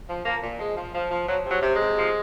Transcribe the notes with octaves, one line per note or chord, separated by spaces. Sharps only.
F3
F3 A#3
A#2
F3 G#3
F3
F3
F3
F3 F#3
C3
F#3
C3
G#3
C3
F3